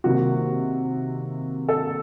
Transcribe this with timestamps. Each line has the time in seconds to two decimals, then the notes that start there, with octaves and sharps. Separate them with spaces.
0.04 C3 D#3 A#3 F#4
1.69 A4